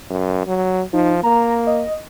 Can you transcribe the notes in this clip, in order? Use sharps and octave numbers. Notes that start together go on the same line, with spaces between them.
F#2
F#3
F3 D#4
A#3 A#5
D#5